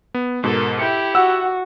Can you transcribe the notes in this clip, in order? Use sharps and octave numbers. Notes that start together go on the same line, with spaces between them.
B3
G#2 B2 A4 A#4
E4 G4 E5 G5 C#7
F#4 F#5 E6